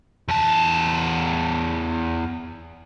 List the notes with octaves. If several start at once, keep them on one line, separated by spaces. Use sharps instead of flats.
E2 A5